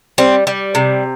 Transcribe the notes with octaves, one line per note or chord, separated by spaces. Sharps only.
G3 C4
G3
C3